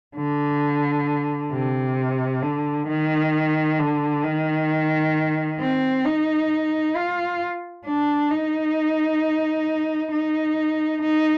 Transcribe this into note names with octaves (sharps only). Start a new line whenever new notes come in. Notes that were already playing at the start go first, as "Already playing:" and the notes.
D3
C3
D3
D#3
D3
D#3
C4
D#4
F4
D4
D#4
D#4
D#4